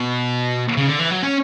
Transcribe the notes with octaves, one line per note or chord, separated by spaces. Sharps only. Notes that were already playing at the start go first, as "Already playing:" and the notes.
Already playing: B2
C#3
D3
E3
F#3
C#4